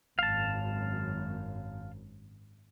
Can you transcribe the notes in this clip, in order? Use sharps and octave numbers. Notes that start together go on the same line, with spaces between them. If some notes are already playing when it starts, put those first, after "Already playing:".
G#1 F#2 F5 A5